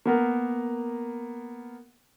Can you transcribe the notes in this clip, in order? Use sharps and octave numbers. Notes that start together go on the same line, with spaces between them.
A#3 B3 A#4